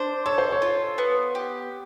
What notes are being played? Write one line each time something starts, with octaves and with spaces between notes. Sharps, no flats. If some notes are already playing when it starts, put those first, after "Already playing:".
Already playing: D4 C5
A4 C#5
C5
C#5
F4
B3
G4